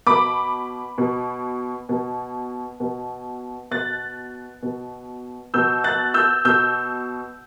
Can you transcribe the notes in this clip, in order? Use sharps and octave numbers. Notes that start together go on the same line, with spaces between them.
B2 B5 D6
B2
B2
B2
B2 F#6 A6
B2
B2 E6 G6
F#6 A6
E6 G6
B2 E6 G6